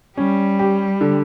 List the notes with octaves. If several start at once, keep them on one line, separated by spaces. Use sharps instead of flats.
G3 C#4
G4
D3